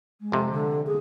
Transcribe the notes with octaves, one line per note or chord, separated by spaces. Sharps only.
G#3
F2 C3
D3
G#4